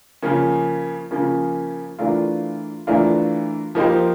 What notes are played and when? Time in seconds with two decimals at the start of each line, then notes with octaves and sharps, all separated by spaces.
0.23 C#3 F3 A#3 C#4
1.11 C#3 F3 A#3 C#4
1.99 E3 A3 D4 F4 A#4
2.87 E3 A3 D4 F4 A#4
3.75 F3 A#3 D#4 G4 C5